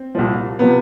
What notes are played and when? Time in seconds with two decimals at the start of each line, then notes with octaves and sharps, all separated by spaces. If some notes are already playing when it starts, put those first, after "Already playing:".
Already playing: C4
0.15 C2 A#2 F3
0.59 C3 F3 B3